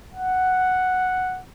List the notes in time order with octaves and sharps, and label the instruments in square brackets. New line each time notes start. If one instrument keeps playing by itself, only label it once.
[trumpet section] F#5